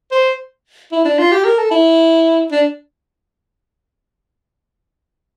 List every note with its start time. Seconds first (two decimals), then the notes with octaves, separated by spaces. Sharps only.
0.12 C5
0.92 E4
1.05 D4
1.19 F4
1.31 G4
1.45 A#4
1.59 A4
1.71 E4
2.52 D4